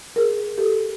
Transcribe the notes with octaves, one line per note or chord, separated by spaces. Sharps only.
G#4 A#4
G4 A4